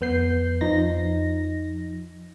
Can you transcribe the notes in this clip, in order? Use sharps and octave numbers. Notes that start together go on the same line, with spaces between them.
F2 B3 G6 C7
F2 F3 D#4 A#6